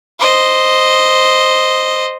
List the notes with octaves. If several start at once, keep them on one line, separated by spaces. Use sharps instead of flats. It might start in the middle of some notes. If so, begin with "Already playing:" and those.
C5 D#5